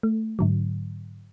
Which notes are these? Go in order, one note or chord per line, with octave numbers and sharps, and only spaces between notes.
A3
G#2 D3 F#3